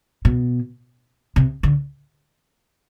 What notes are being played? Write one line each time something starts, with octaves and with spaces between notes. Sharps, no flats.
B2
C3
D3